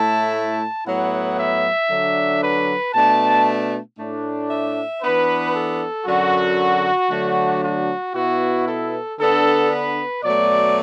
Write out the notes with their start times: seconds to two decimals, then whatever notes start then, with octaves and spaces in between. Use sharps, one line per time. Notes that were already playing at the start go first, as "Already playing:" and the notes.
Already playing: A2 A3 E4 A5
0.33 A5
0.85 A2 F#3 B3 E4 F#5
1.37 E5
1.90 D3 F#3 D4
2.42 B4
2.94 B2 A3 D4 A5
3.98 A2 A3 D4
4.50 E5
5.02 E3 B3 D4 B4
5.54 A4
6.06 F#2 D3 F#3 F#4
7.10 D3 F#3 A3 D4
7.62 F#4
8.14 B2 B3 E4 F#4
8.67 A4
9.18 D3 B3 D4 A4
9.70 B4
10.23 B2 F#3 A3 D5